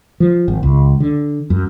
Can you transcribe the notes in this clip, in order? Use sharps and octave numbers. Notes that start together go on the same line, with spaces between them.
F3
G#1
C#2
D3
F#2